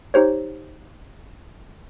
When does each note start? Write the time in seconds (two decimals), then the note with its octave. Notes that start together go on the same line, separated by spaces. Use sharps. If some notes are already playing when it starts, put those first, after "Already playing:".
0.14 D#4 G4 C5 C#5